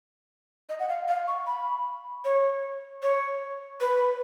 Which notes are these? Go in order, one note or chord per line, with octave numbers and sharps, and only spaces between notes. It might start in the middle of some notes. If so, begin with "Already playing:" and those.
D#5
F#5
F5
F5
C#6
B5
C#5
C#5
B4